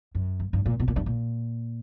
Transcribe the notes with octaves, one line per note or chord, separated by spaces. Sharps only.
F#2
G2
G2
A#2
B2
A#2
G2
A#2